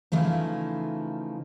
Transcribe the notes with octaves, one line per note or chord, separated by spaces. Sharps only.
C#3 E3 F3 A3 D#4